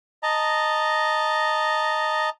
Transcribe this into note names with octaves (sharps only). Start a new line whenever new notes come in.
D#5 A5 A#5